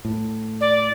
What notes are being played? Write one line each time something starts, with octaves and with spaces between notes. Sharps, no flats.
A2
D5